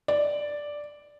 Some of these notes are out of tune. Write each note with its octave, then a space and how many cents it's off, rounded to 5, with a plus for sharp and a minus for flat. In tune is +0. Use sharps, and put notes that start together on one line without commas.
D5 +0